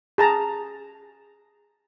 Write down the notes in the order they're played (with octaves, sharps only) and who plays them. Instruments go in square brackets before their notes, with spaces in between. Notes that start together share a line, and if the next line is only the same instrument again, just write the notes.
[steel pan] G#4 A5 A#5